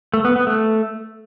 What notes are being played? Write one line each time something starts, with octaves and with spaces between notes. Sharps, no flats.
A3
B3
B3
A3